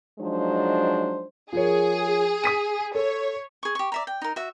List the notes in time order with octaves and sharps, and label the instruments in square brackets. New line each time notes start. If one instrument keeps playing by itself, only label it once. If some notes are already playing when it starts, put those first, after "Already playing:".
[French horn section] F3 F#3 G#3 D4 D#4 C5
[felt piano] F3 A#4 C#5 [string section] G#4
[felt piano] D#6 B6 D#7
[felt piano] A4 [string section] C#5
[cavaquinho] G#4 C#6
G4 C#6
D5 E5 A#5
G5
D#4 A#4
F#4 E5